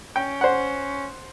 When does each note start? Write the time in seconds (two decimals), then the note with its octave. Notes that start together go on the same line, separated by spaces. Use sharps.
0.16 C#4 G5
0.41 C5 F#5